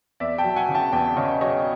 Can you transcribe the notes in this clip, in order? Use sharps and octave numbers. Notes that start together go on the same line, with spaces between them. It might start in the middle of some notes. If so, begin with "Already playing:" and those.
E2 D5 E5
G5 A5
F#3
F#5 G#5
C#3
G5 A5
E2 G5 A5
C#3 C#5 D#5
F#3 C#5 D#5